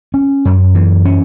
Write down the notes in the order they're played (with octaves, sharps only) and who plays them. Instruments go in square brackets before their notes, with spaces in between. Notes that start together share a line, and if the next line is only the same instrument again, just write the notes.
[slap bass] C#4
F#2
E3
C#4